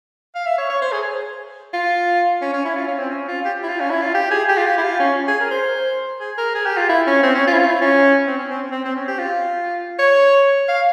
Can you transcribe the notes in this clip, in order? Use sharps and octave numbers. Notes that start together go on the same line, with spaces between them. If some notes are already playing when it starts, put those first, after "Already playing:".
F5
E5
C#5
C#5
C5
G#4
F4
C#4
C#4
E4
F4
C#4
C4
C#4
F4
G4
E4
F4
C#4
E4
F4
G4
G#4
G4
F4
G4
E4
F4
C#4
G#4
A#4
C5
G#4
A#4
G#4
G4
F4
E4
C#4
C4
C#4
F4
E4
F4
E4
C#4
C4
C#4
C4
C4
C4
C#4
G4
F4
C#5
F5